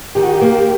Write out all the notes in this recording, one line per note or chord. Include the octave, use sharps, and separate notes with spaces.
D#3 G4
F#4
G4
A#3